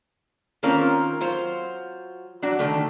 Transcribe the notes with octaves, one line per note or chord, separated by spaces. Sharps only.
D#3 A#3 C4 C#4 F4 A#4
F#3 F4 C5
F#3 D4 F#4
D3 D#3 A3